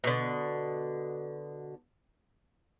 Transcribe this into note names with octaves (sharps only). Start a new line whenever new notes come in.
B2 D3